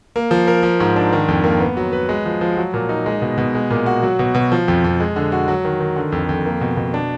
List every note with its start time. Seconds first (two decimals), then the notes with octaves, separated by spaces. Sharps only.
0.16 A#3
0.31 F3
0.48 A#4
0.63 F3
0.80 G#2
0.96 D4
1.13 D#3
1.28 F2
1.44 A#3
1.60 B3
1.77 F#3
1.92 B4
2.09 G#3
2.26 F3
2.41 F3
2.57 F#3
2.74 A#2
2.89 D#4
3.06 G#3
3.22 B2
3.38 B2
3.55 G#3
3.70 A#2
3.86 F#4
4.03 F#3
4.19 B2
4.35 B2
4.52 F3
4.68 F2
4.84 F2
5.00 G#3
5.16 D3
5.32 F#4
5.48 F#3
5.65 D#3
5.80 D#3
5.96 D3
6.12 F2
6.29 F2
6.46 A#3
6.61 B2
6.77 B2
6.94 D4